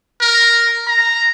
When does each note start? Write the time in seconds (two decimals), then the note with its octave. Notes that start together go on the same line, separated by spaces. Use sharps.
0.21 A#4
0.87 A#5